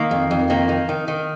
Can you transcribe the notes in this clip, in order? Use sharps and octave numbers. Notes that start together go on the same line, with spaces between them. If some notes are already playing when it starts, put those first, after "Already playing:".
Already playing: D#3 A#3
F2
F2
D#3 A#3
D#3
D#3
D#3